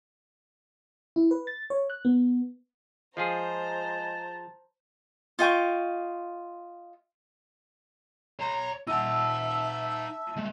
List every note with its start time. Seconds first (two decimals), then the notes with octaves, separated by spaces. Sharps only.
1.16 E4
1.31 B4
1.47 A6
1.70 C#5
1.90 F#6
2.05 B3
3.17 F3 G#3 F4 G#4 C5 A5 A#5
5.39 F4 D#5 G5 C#6
8.39 C#5 A#5 C6
8.87 D#4 E5 F#5 A5 E6
10.36 G#3 A3